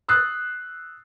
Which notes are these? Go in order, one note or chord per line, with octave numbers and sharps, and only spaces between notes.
D#6 E6 F#6 A6 C7